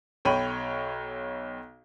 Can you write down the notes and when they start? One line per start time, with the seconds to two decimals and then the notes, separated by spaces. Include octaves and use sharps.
0.25 B1 C#5 G5 B5 D#7